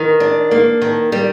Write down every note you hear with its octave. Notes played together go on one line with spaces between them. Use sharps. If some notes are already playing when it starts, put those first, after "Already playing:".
Already playing: D#3
D4
A#3
D#3
G3